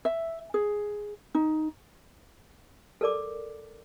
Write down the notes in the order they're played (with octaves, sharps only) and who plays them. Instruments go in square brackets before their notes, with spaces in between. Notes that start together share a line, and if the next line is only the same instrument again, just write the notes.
[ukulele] E5
G#4
D#4
[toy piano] A4 A#4 D5 D6